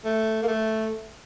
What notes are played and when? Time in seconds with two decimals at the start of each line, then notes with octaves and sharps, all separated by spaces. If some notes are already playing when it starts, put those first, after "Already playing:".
0.05 A3
0.42 A#3
0.48 A3